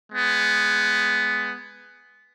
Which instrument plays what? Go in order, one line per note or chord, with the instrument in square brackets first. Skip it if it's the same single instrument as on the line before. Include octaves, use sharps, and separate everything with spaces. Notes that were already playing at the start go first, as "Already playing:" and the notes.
[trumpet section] G#3 B3